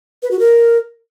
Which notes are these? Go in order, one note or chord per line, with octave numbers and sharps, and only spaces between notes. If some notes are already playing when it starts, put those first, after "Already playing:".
B4
F#4
A#4